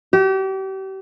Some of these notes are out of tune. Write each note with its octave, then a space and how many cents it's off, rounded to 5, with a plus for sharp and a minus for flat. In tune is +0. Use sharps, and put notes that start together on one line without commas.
G4 -35